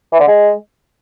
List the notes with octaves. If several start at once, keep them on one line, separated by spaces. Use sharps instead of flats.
E3
D3
G#3